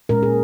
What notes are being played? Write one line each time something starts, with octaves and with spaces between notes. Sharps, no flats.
A#2 G#3 C#4 A#4
G#4